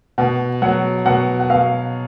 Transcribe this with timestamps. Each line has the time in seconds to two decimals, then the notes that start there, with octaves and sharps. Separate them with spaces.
0.18 B2 F#5
0.62 F#3 F#5
1.06 B2 F#5
1.40 F#5
1.50 B2 F5